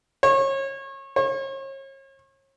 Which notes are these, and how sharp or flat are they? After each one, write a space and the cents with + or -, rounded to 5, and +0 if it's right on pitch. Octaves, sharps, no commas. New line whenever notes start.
C#5 -30
C#5 -40